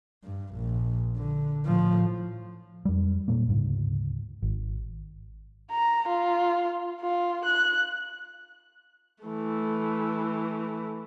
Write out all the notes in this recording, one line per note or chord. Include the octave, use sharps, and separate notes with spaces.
G2
A#1
D3
A2 F3
F2 G3
A#2 G3 A#3
D2 G#2 C#3
G#1
A#5
F4
F4
F#6
E3 A3